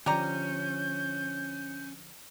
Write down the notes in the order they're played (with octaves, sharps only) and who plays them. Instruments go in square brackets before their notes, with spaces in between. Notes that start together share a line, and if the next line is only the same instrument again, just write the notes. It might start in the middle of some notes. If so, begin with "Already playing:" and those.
[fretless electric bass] D3 F3 [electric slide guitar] C#4 [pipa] G4 D5 A#5 [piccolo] G6